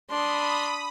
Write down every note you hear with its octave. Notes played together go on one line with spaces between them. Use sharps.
D4 B5 C6 D#6